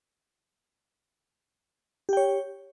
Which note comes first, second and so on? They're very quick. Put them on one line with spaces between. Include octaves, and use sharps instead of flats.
G4 G5 C#5